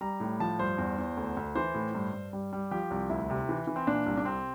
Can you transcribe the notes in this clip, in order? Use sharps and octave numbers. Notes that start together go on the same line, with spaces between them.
G3 A#5
A2
F3 A5
G2 C5
E2
E2
D2
D2
E3 C5
A2
G2
G2
G3
G3
F3 G4
C2
D2 E4
C3
E3
E3
C4
A#2 D4
C2
D4
C3 C4